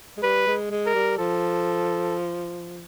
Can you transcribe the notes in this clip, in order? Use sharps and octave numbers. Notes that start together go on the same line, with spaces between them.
G#3
G3 B4
G#3
G#3
A#4
G3
F3 A4